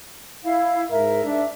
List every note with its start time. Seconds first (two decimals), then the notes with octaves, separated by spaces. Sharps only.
0.43 E4 F5
0.91 G#2 A#4 E5
1.24 D4